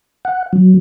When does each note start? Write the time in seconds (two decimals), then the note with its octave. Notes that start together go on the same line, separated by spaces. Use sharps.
0.25 F#5
0.53 F#3